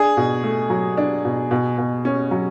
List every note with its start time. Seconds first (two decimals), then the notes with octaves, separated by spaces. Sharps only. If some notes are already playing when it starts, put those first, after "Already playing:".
Already playing: D4 G#4
0.17 B2
0.43 A3
0.70 F#3
0.97 D4
1.25 B2
1.51 B2
1.78 B2
2.05 C#4
2.31 F#3